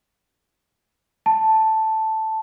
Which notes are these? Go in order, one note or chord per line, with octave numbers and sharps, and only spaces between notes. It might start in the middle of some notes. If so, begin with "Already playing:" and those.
A5